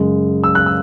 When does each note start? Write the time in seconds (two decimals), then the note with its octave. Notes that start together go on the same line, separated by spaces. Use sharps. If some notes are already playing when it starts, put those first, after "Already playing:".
Already playing: F#2 C#3 G#3
0.44 E6
0.55 F#6
0.66 E6